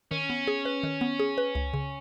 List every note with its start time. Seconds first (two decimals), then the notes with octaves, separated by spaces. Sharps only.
0.11 D#3 C#4
0.30 B3
0.47 G#4
0.65 B4
0.83 D#3
1.01 B3
1.19 G#4
1.38 B4
1.55 C#2
1.74 C#3